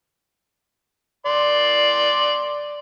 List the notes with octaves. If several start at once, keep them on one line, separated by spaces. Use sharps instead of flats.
D5 C6